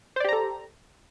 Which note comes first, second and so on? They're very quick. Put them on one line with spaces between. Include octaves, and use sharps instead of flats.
C5 D5 G4 A#5 A4